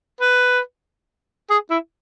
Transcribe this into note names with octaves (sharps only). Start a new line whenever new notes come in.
B4
G#4
E4